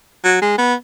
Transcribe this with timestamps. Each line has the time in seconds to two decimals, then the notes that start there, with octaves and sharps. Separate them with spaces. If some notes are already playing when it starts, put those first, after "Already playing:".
0.24 F#3
0.41 G#3
0.59 B3